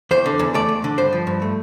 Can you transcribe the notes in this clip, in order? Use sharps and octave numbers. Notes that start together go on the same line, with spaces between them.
E2 C5
D3
E2
A3 D5
E2
D3
G2 C5
F3
G2
A3